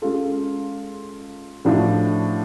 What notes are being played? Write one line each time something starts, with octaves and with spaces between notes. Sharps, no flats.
G#3 C#4 F4 A4
A2 F3 A3 D4 F#4